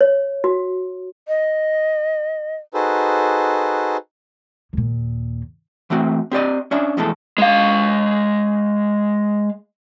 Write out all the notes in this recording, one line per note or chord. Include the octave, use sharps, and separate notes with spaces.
C#5
F#4
D#5
D#4 F#4 G#4 A4 B4 C5
D#2 A#2
E3 A3 C4 F#4
C4 G4 D5 D#5
C#4 D4 E5
F2 B2 E3 G#3 A3 A4
G#3 F5